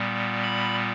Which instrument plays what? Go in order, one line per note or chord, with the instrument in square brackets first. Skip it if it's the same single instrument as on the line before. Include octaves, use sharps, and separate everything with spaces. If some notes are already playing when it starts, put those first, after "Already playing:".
Already playing: [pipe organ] A#2 G3 B3
B5